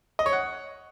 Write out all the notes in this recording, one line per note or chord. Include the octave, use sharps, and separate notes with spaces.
D#5
C#5
F#5